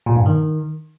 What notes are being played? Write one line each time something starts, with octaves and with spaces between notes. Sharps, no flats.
A#2
G2
D#3